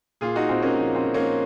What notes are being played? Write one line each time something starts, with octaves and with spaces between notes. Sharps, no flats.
A#2 F4 G#4
D#4 F#4
A#2 C4
A#3 C#4
F3
C4
F3
A#3 C#4